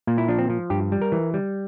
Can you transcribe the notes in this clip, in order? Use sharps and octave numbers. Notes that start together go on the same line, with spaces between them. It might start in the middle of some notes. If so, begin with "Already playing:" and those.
A#2 A#3
E4
F3 D4
C4
F3
G2 G4
G3
A#4
E3
G3